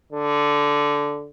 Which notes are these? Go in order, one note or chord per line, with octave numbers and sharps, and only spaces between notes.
D3